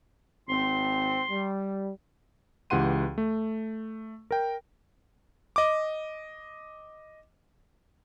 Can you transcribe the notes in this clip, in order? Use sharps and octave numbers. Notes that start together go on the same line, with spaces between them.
G#1 C4 C6
G3
C#2 E3 G4 F#5 C6 D#7
A3
A#4 G5
D#5 D6